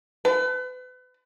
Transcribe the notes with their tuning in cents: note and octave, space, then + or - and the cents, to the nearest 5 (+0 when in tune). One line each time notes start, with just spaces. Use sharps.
B4 +35